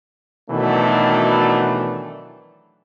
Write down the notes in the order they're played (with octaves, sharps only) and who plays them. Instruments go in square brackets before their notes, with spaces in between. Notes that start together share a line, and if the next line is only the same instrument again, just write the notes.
[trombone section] B2 D#3 E3 F#3 A3 D4